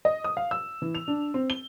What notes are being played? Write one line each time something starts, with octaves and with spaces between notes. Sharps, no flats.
D#5
D#6
F5
E6
E3
F7
D4
C4
G7